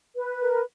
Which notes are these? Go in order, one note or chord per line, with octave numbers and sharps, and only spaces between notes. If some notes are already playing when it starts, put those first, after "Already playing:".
B4
A#4